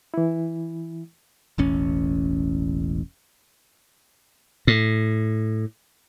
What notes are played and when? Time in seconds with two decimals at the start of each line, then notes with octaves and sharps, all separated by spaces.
0.14 E3 E4
1.58 E1 A1 C#4
4.67 A2